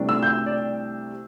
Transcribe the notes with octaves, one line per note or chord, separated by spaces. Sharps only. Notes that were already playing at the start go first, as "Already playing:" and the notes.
Already playing: C2 C3 A3 D4
E6
G6
E6
D5